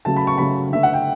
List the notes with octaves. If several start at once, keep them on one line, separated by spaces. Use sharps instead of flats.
C#3 F#3 A3 A5
B5
C#6
C#3 F#3 A3 B5
D3 A3 E5
F#5
G5